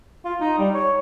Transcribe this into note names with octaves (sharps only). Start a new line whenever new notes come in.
F4
D#4
G3
C#5